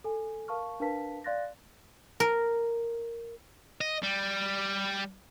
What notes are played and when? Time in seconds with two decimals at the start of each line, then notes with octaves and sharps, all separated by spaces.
0.04 A4 G#5
0.48 A#4 F5 A5 C#6 F6
0.80 D4 A#4 B4 F5 A5 B6
1.24 D5 F5 C6 F#6 A6 A#6
2.20 A#4
3.81 D#5
4.03 G3